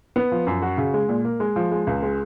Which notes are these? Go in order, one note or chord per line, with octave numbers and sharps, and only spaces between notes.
B3
F3
F#2
F#4
C#3
G#3
A#2
A#3
G#3
F3
G#3
C#2
G#3